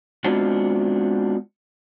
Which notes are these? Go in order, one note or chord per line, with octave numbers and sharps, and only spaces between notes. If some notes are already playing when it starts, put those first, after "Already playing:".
G#3 B3 C4 D4 F4 F#4